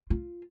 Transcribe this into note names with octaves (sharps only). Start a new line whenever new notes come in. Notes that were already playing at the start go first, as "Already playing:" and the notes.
F4